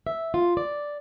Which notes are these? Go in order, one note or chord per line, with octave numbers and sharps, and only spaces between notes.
E5
F4
D5